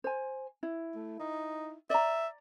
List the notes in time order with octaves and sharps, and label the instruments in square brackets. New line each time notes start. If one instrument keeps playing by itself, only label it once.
[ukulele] C5 G#5
E4
[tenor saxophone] A3
D#4
[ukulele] D5 A#5 [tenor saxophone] E5